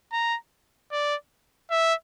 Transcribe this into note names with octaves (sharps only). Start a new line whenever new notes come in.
A#5
D5
E5